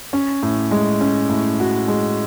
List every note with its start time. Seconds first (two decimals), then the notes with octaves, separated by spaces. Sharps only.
0.13 C#4
0.43 A2
0.71 G#3
1.01 C#4
1.30 A2
1.60 F#4
1.88 G#3